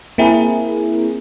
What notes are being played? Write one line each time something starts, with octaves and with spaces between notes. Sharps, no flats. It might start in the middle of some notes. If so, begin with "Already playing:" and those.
A#3 C4 E4 G#4 A#4